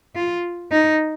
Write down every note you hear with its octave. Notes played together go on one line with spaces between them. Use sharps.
F4
D#4